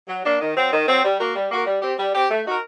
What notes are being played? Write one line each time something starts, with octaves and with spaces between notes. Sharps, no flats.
F#3
A#3 D4
D#3
F#3 C4
D#3
F#3 C4
G3
A#3 F#4 A#4
G3
A#3 F#4 A#4
G3
C4 G4
G3
C4 G4
A3
D#4 F#4 A#4